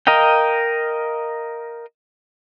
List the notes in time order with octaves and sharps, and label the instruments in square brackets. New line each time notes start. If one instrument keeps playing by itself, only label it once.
[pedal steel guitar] A#4 D#5 F5 G5